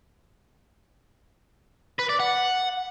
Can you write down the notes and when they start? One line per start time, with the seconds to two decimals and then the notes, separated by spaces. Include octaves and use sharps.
1.99 B4
2.10 D5
2.20 F#5